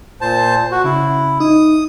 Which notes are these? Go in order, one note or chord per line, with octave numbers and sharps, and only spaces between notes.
A#2 C5 A5
F#4
C#3 E4
D#4 D#6